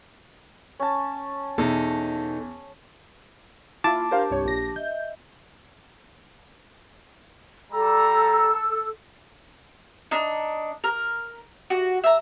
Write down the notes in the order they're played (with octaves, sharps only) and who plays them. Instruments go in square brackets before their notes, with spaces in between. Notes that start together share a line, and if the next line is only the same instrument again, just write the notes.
[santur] C#4 A5
[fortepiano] E2 [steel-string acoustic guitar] B2 D#4 A4
[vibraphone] A#3 [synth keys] E4 F4 [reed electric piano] A5 D6
[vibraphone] D4 G4 [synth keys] A#4 C5 F5
[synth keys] C2 G2 C#5
A#1 A#6
[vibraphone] D#5 E5 [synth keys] G6
[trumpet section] G3 A#5 [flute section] A4 E6
[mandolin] D4 D#4
A#4
F#4
E5 A#5